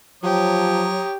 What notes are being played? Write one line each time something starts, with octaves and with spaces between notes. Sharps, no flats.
F3 F#3 G4 C#5 A#5 D#6